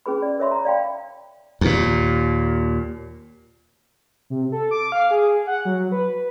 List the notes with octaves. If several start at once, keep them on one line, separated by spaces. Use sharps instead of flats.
C#4 G#4 B4 B5
D5
A#4 C#5 E5 B5 C6
A#5
D5 F5 G5 B5
D#2 A#2
C3
A4
D6
F5
G#4
F#5
F#3
B4